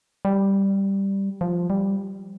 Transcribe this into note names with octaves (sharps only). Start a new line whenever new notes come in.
G3
F3
G3